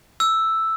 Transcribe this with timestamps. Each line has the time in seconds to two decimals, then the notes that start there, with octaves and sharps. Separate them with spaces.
0.20 E6